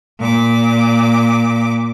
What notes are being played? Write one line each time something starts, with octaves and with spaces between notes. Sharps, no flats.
A#2 D6